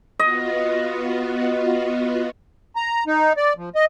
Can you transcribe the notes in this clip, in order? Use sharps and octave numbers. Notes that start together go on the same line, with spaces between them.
B3 F4 F#4 D#5
A#5
D#4
D5
F3
D#5